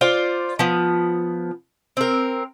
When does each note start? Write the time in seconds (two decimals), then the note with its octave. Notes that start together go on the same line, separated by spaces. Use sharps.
0.01 F4 C5 D5
0.59 F3 B3
1.97 C4 A#4